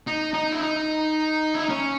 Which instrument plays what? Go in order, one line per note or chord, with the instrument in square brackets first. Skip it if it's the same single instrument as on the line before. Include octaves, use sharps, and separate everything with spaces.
[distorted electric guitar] D#4
D#4
E4
D#4
E4
D#4
C#4